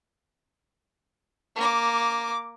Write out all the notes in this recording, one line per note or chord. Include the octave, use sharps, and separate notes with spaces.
A#3 D6